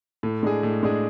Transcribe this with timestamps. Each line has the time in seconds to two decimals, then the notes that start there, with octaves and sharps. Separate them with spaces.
0.23 A2
0.43 G#3 D4 G#4
0.63 A2
0.83 G#3 D4 G#4